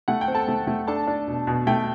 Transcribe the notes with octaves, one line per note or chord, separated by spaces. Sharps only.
A3 F#5
G5
C4
A4 A5
A3
A3
D4 A4 A5
D4
B2
B2
A3 G5